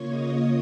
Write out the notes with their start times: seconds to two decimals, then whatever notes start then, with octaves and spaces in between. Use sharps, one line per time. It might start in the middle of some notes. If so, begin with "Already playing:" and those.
Already playing: C#3 A#3 F4 C#5 C#6
0.09 D#5 D#6